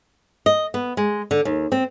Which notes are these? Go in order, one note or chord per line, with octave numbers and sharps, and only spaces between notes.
D#5
B3
G#3
D3
D#2
C4